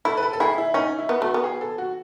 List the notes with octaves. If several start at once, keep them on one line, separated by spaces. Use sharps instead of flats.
E4 A4
B4
A4
A4
E4 G#4
E4
C#4 D#4
E4
B3
A3 F#4
B3
G#4
A4
F#4